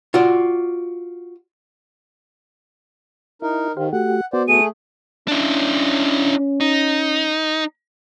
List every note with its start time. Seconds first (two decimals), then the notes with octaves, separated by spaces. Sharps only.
0.14 F4 F#4 D5
3.42 D#4 E4 A#4
3.77 D#3 G4 C5 F5
3.93 A3 F#4 G4 F#5
4.33 B3 F#4 C5 D5
4.48 A3 G#4 D#7
5.28 C#4 D4 E4
6.60 D#4